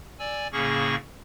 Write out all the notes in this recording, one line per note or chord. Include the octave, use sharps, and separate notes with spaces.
D5 G#5 E6
A2 C#3 A#3 C#4 G#4 C#6